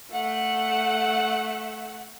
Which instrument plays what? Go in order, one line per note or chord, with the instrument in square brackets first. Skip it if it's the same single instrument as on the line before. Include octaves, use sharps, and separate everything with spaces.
[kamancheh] A3 F#5